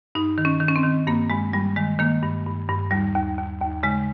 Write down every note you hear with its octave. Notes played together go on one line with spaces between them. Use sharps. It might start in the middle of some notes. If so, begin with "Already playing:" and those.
G2 D#4
D#3
C#4
D#3
C#4
C4
D#3
G2 A#3
G2 G#3
G2 G3
D#3 G#3
D#3 A#3
G2
G2
G2
D#2 G3
D#2
D#2
D#2
C#3 G#3